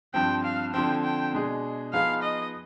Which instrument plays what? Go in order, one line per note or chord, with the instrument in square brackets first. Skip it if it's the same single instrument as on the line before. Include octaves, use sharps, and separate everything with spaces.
[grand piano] G2 F3 C4 [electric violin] G5
[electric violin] F5
[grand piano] D3 F3 C4 [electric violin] G5
[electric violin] G5
[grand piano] B2 G#3 D4 G#4
[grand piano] F3 B3 D#4 G#4 B4 [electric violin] F5
[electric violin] D#5